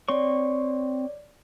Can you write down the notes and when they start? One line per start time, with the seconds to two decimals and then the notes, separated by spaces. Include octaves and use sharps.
0.09 C4 C#5 D5 C6 C#6